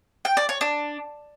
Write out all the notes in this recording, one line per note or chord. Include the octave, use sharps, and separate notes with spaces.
G5
D5
C#5
D4